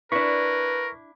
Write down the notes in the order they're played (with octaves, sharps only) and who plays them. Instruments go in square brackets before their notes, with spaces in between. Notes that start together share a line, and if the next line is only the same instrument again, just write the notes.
[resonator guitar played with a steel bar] D4 E4 [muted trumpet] A#4 [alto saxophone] B4 [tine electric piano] C#6 B6